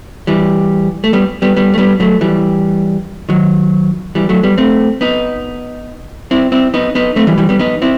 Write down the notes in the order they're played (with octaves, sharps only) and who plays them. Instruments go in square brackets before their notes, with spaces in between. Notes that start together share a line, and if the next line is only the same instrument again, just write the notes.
[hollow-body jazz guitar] E3 G3
A3
G3 B3
G3 B3
G3 B3
A3
G3 B3
F#3 A3
E3 G3
D#3 F#3
E3 G3
F#3 A3
G3 B3
A3 C4
B3 D#4
C4 E4
C4 E4
B3 D#4
B3 D#4
A3 C4
E3 G3
E3 G3
G3 B3
B3 D#4
C4 E4